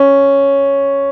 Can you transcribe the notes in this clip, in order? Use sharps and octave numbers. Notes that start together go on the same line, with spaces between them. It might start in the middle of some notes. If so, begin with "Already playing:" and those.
Already playing: C#4